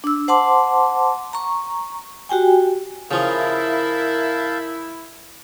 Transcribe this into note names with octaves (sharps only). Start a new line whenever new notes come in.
D4 E6
C5 F#5 A5 C6 D6
A#5 C#6
F#4 G4 G5 G#5
C#3 F3 E4 A#4 F5 A5 G6